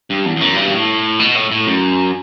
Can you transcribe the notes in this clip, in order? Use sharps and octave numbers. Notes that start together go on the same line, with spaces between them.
G2
E2
E2
F#2
G2
B2
A2
B2
A2
A2
F#2